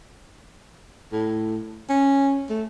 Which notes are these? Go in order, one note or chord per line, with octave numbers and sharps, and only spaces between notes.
A2
C#4
A3